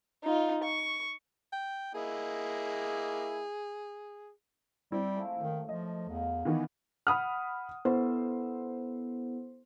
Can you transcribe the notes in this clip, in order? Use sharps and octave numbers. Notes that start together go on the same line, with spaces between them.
D#4 F4
C#6
G5
A#3 E4 G#4 D#5
G3 C4 E4
F3 G#3 A3
F#2 A2 D#3
F3 D#5
E2 F4 A#4 F5
D#3 E3 B3 D#4
F#5 B5 D#6 F6
B3 E4 A4 C5